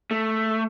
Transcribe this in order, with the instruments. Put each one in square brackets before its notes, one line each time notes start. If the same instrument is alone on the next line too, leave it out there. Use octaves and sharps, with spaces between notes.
[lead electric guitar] A3